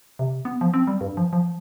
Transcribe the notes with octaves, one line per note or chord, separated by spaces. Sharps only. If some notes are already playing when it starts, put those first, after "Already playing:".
C3
B3
F3
C4
G3
G2
F3
F3